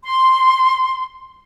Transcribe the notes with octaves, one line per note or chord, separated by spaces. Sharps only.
C6